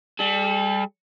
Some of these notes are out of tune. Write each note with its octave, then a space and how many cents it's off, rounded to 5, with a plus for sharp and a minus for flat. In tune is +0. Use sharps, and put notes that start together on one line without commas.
G3 +20 A4 -35